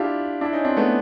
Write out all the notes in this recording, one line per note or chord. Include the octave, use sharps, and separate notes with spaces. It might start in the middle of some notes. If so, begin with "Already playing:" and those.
Already playing: D4 E4 F4 G4
D4 E4
C#4 D#4
C4 D4
A3 B3